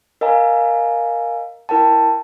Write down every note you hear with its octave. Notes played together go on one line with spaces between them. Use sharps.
A#4 D#5 F5 G#5 A#5
E4 A#4 G5 A5